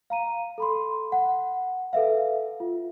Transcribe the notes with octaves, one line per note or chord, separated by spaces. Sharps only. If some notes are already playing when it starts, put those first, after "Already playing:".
F5 A#5 D#7
A4 B5 C6
F#5
A4 B4 E5 F5
F4